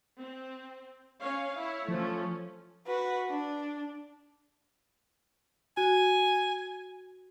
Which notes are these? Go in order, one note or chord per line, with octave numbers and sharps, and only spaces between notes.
C4
C#4 C#5 F5
E4 C#5
F3 A3 C#4
F#4 B4
D4
F#4 G#5